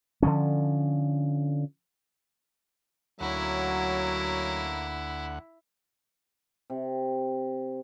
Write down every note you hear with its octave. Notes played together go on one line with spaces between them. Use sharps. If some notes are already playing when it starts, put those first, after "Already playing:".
D3 F3 C#4
D2 F#3 A#3 C#4 E4 F#5
C3